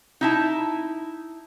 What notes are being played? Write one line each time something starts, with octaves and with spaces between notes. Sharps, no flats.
D#4 E4 A5